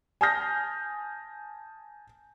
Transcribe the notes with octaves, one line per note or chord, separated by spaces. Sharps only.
G#5 A5 D#6 F6 G6 A#6